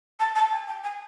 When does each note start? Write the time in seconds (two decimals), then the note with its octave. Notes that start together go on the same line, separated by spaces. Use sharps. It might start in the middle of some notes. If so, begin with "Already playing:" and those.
0.20 A5
0.35 A5
0.52 G#5
0.68 G5
0.84 G#5